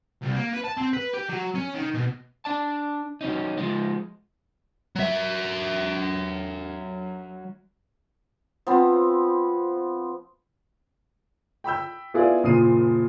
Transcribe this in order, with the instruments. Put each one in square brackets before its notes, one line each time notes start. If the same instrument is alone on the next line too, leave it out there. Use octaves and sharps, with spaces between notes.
[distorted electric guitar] C2
A#3
B4
A5
C4
B4
G4
F#3
C#4
D#3
B2
[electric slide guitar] D4 D5 A5
F#3 C#4 D#4
F3 G#3
[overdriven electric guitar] F#3 E5
[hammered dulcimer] F3 B3 C4
[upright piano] G5 B5 E6 G6
B3 E4 F4 G#4 D5 F5
F#1 A#2 F3 D#6 C7 D#7